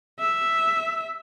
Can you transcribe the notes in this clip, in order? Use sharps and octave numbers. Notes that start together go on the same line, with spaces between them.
E5